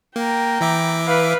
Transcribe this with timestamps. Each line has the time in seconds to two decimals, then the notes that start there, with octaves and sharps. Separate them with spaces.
0.16 A#3 G5 A#5
0.61 E3 E5 D6
1.06 B4 F5